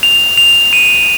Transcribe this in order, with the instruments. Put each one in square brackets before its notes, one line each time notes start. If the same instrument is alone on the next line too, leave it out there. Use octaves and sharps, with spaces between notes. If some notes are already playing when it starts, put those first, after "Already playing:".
[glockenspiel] F7
F7
D#7